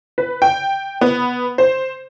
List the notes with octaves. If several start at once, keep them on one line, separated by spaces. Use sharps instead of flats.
B4
G5
B3
C5